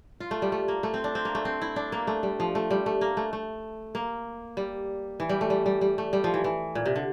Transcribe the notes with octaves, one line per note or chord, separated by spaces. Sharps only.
F4
A3
G3
A3
A#3
A3
C4
D4
C4
A#3
A3
C4
E4
D4
A#3
A3
G3
F3
A3
G3
A3
A#3
A3
A3
A#3
G3
E3
G3
A3
G3
G3
G3
A3
G3
F3
E3
E3
A#2
C3
D3